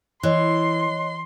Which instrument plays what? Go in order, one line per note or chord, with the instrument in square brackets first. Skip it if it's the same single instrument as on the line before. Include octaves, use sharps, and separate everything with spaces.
[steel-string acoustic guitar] E3 [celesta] C#5 D#5 F#6 [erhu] C6